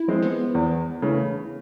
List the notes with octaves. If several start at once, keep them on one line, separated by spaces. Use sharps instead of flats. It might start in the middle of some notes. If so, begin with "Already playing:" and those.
Already playing: E4
F3 G#3 C4
B3
E2
C#3 E3 A3